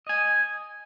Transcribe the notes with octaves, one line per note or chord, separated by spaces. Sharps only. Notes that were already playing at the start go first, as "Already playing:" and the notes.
D#5 G#5